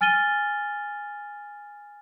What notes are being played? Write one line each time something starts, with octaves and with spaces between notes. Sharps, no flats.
G#5 F6 A6 D#7 G7